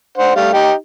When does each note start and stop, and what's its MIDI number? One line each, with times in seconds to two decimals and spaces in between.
0.18 0.34 62
0.18 0.34 72
0.18 0.34 78
0.36 0.51 55
0.36 0.51 57
0.36 0.51 77
0.53 0.72 63
0.53 0.72 67